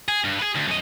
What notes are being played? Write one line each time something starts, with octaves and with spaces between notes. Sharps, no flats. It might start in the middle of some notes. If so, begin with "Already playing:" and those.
G#4
G2
G#4 B4
D2
F#2 D#5